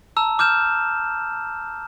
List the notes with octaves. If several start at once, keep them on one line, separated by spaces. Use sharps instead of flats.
A5 A#5 E6
D6 F6 G6 E7